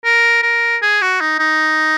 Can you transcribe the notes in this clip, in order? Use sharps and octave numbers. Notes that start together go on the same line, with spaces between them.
A#4
A#4
G#4
F#4
D#4
D#4